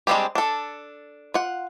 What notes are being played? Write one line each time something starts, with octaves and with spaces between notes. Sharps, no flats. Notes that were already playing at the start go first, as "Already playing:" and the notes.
G3 G#3 C4 D4 G4
D4 A4
F4 F#5